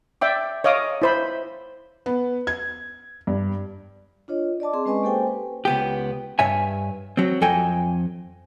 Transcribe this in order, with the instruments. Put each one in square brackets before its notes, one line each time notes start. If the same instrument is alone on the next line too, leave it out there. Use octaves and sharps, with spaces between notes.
[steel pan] D5 E5 G5 D6
C#5 D#5 F5 D6 D#6
E4 C5 B5
[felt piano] B3
G#6
G2
[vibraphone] D4 F4 C#5 D#5
D5 D#5 A5 D6
C4 G#4 C6
G#3 C#4 B4 D#5 G#5 C#6
A#3 G4 A4 C5 G5 G#5
B4
[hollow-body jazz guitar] C#2 B3 G4
G2 C#5 E5 G#5
F#3 C4
F2 A4 D#5 G5 G#5